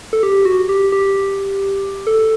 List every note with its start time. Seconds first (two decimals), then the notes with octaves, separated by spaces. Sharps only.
0.13 A4
0.23 G4
0.45 F#4
0.69 G4
0.92 G4
2.07 A4